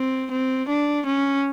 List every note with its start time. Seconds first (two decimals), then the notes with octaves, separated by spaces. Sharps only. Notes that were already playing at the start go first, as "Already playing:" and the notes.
Already playing: C4
0.31 C4
0.68 D4
1.06 C#4